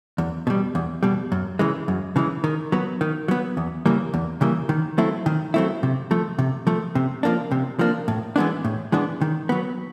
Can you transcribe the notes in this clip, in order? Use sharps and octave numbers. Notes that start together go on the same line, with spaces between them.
E2
B2 G3
E2
B2 G3
F#2
C#3 E3 G#3
F#2
C#3 E3 G#3
D#3
F#3 B3
D#3
F#3 B3
E2
C#3 E3 G3 A#3
E2
C#3 E3 G3 A#3
D#3
F#3 A3 C4 E4
D#3
F#3 A3 C4 E4
C3
F3 A3
C3
F3 A3
C3
F3 A#3 D4
C3
F3 A#3 D4
A2
E3 G#3 B3 D4
A2
E3 G#3 B3 D4
D#3
F#3 B3